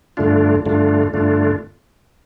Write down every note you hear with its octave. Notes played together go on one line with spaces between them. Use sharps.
G2 D3 A3 D4 F4
G2 D3 A3 D4 F4
G2 D3 A3 D4 F4